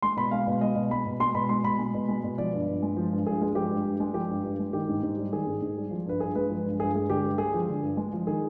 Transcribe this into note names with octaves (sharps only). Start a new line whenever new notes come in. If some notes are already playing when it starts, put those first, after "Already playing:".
G#3 C6
B2 B5
G#3 F5
B2
G#3 D#5
B2
G#3 B5
B2
G#3 C6
B2 B5
G#3 C6
B2 B5
G#3
B2
G#3
B2
F3 D5
G2
G2
G#3
F3
G2
G2 G#4
G#3
F3 G4
G2
G2
G#3
F3 G4
G2
G2
G#3
D#3 G4
G#2
G#2
G3
D#3 G#4
G#2
G#2
G3
F3
G2 B4
G2 G#4
G#3 B4
F3
G2
G2 G#4
G#3 G#4
D3 G4
G2
G#3 G#4
F3
D3
G2
G#3
F3
D#3 G#4